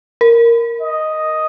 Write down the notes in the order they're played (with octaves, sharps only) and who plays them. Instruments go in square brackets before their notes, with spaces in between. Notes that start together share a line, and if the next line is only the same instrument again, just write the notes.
[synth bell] A#4
[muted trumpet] D#5